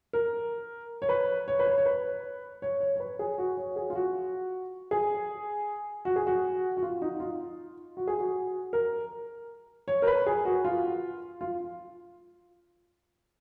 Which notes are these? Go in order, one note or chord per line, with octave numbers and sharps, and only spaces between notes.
A#4
C#5
B4
C#5
B4
C#5
C#5
B4
C#5
C#5
C#5
B4
G#4
F#4
C#5
G#4
F4
F#4
G#4
F#4
G#4
F#4
F#4
F4
D#4
F4
F#4
G#4
F#4
A#4
C#5
A#4
B4
G#4
F#4
F4
F4